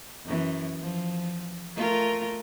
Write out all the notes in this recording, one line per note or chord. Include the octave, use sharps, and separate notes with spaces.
F#2 E3
F3
A3 F4 A#4